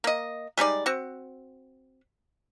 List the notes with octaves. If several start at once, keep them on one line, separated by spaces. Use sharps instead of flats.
A#3 D#5
G3 G#3 D#4 D5
C4 F#4